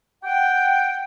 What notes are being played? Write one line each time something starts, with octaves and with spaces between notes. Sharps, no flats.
F#5 G5